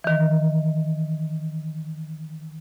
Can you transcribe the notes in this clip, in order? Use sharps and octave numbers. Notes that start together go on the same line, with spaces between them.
D#3 E3